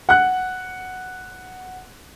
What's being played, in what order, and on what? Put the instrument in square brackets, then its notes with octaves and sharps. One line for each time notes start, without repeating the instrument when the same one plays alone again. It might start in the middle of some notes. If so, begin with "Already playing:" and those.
[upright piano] F#5 F#6